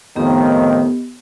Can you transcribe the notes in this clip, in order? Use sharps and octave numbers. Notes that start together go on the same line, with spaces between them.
F2 A2 D#3 B3 G4 D#5